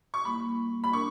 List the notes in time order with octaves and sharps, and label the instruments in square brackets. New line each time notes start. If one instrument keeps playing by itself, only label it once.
[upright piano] C#6
[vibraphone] G3 A#3 E4 [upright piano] B5
[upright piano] B5
[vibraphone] D4 A#4 [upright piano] C#6